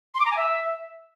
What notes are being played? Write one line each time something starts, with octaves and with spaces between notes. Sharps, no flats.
C6
D6
A#5
G#5
E5